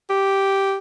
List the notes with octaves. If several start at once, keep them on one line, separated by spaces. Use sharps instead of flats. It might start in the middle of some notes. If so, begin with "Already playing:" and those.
G4